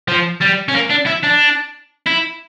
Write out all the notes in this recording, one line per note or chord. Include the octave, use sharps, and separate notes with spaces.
F3
G3
C#4
A#3
D4
E4
D4
E4